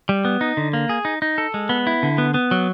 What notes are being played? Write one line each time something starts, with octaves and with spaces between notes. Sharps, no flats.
G3
B3
D#4
D3
A#3
G#4
D#4
D#4
A4
G#3
B3
E4
D3
B3
B3
F#3